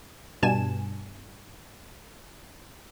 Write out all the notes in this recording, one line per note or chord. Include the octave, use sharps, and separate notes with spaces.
G2 B2 G#5 A5 E7